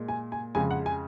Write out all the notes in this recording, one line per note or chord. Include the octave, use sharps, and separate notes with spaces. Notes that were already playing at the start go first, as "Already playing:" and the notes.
Already playing: A#2 G#3
G#5
G#5
F2 C#3 G#3 G#5
F#5
G#5